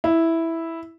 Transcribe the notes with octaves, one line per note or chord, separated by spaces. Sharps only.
E4